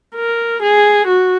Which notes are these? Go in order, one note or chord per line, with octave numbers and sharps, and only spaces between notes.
A#4
G#4
F#4